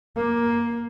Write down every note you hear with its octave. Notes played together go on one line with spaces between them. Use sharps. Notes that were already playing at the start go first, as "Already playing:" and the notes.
A#3